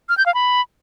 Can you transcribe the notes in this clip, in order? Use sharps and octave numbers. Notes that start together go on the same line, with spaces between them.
F6
G6
F5
B5